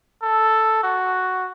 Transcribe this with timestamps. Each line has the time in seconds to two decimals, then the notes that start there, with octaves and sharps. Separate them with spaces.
0.23 A4
0.83 F#4